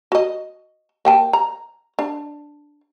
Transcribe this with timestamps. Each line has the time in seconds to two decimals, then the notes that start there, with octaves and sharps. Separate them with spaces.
0.12 F#4 D#5
1.05 A#3 G5 A5
1.33 A#5
1.99 D4